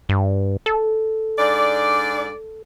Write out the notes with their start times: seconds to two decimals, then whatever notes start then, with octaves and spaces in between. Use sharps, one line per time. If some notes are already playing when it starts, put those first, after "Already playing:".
0.09 G2
0.66 A4
1.38 G#2 D4 D5